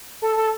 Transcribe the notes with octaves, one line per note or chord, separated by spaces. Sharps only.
A4
A4